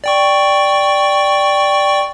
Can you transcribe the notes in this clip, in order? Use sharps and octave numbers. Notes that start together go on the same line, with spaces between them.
D5 G5 C#6